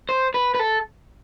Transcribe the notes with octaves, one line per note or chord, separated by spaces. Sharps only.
C5
B4
B4
A4